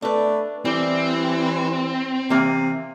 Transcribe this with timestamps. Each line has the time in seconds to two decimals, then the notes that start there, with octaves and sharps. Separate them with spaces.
0.02 A3 D4 B4
0.65 E3 G3 C4
2.30 C3 E3 A#3